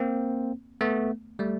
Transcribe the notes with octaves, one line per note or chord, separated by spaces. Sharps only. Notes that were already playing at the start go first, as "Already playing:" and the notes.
Already playing: A#3 C4
A3 B3
G3 A3